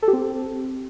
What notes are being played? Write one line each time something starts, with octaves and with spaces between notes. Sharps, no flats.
A4
G4
C4